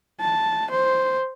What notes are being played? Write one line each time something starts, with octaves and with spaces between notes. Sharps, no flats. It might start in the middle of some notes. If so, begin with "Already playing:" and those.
A5
C5